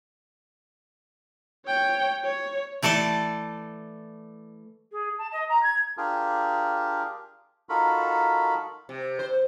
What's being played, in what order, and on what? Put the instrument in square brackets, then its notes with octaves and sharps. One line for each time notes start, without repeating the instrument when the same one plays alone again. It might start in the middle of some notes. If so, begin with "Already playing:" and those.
[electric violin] C#5 G5
C#5
[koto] E3 A3 A4 D5 A5
[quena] G#4
A5
D#5
A#5
G#6
[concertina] D4 F4 G4 G#4 A#4
D#4 F4 F#4 A4 A#4 B5
[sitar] C3
C5